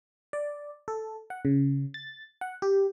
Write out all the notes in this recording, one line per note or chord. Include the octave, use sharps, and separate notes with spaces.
D5
A4
F#5
C#3
A6
F#5
G4